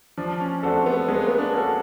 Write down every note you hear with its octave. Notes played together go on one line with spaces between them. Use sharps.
F3 D4
C#4
A3 C4 D4 F#4 A4
B3
G#3 B3
A#3
B3
D4
C#4 F#4 A4